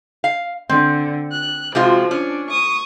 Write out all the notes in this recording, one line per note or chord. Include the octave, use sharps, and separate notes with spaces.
F5
D3 C4
F#6
C3 F3 G#3 F4 F#4
C#4 D4
C#6 D#6